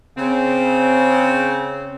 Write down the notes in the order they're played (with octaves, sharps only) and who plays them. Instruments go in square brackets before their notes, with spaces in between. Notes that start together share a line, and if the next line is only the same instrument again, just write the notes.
[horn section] C#3 C4